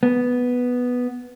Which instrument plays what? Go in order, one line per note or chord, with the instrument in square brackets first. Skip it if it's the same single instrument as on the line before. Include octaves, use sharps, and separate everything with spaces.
[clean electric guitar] B3